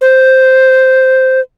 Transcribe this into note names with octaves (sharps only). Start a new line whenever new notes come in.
C5